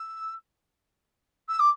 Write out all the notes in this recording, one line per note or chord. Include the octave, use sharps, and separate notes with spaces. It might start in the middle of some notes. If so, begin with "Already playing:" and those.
Already playing: E6
E6
D6